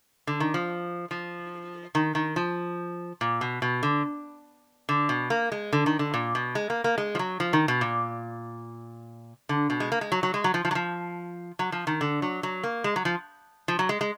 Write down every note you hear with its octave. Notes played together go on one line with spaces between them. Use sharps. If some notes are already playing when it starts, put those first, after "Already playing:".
D3
D#3
F3
F3
D#3
D#3
F3
A#2
B2
B2
D3
D3
B2
A#3
G#3
D3
D#3
D3
A#2
B2
G#3
A#3
A#3
G#3
F3
F#3
F3
D#3
B2
A#2
D3
B2
G#3
A#3
G#3
F#3
F#3
G#3
F#3
F3
F3
F#3
F3
F#3
F3
D#3
D3
F#3
F#3
A#3
G#3
F#3
F3
F3
F#3
G#3
G#3